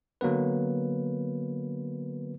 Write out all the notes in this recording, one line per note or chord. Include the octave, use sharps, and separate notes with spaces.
D3 F#3 A#3 B3 B4